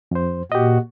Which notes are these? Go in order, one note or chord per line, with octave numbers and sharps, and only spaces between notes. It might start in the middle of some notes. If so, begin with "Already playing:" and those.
F2 C5
A#2 F#4 G4 D#5